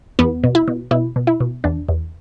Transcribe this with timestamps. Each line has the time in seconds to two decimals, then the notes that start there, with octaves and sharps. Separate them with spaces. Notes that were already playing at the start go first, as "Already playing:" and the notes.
0.19 E2 B3
0.44 B2
0.55 E4
0.68 B2
0.91 B2 E4
1.16 B2
1.27 E4
1.40 B2
1.64 E2 D4
1.89 E2